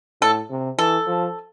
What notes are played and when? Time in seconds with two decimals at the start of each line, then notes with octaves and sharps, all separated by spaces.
0.21 A2 A4
0.50 C3
0.78 E3 A4
1.07 F3